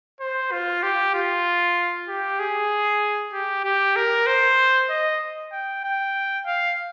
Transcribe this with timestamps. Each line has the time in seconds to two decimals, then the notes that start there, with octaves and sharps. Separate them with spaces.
0.20 C5
0.52 F4
0.83 G4
1.14 F4
2.08 G4
2.40 G#4
3.33 G4
3.64 G4
3.96 A#4
4.27 C5
4.90 D#5
5.52 G5
5.84 G5
6.46 F5